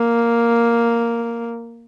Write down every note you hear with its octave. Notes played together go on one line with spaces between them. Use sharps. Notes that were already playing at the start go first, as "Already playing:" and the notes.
Already playing: A#3